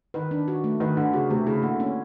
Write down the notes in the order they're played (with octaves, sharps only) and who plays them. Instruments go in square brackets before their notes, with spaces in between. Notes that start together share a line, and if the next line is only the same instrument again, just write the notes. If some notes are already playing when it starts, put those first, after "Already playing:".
[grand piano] D#3 [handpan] B4
[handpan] D4
F#4
A3
[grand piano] D#3 [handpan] B4
[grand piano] D3 [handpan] D4
[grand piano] C#3 [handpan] F#4
[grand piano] C3 [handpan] A3
[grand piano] C#3 [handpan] E4
[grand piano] D3 [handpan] A#3
[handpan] C#4